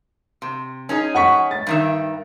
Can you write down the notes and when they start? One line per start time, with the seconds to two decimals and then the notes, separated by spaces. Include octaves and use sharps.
0.42 C3
0.89 C#4 D#4 G#4
1.15 F#5 C#6 B6
1.51 A6
1.67 G2 D#3 E5